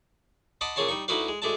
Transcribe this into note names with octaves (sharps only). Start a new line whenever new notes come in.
D#5 F#5 A5 B5 C6 D6
A#2 C#3 G#4 C#5 A5 C6
G3 D#4 C#6
D2 D#4 E4 F#4 B4 F5
G#3
D2 D3 G#3 E5 A5